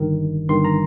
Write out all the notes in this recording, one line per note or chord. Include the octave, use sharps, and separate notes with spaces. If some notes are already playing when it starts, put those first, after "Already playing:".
Already playing: G1 G2 D#3
G1 G2 D#3 C6
A#5